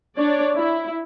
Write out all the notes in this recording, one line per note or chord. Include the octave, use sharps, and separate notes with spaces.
D4 C#5 D5
E4